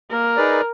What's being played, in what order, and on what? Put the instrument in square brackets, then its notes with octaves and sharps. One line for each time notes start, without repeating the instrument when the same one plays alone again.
[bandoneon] A#3 [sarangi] A#4
[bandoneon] D#4 G#4 B4 D5